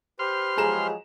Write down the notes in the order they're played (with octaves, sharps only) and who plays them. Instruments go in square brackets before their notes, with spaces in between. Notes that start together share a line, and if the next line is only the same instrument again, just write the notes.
[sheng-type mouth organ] G4 B4 C5 [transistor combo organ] C6 F6
[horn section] F3 F#3 G#3 [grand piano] G#4 A#5 E7